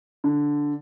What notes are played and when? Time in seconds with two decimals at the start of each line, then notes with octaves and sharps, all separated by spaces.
0.24 D3